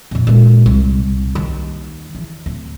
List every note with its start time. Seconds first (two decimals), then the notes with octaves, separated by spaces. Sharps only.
0.11 F2 A#2
0.27 A#2 G#3
0.66 C2
1.35 D#2
2.15 E2
2.46 D1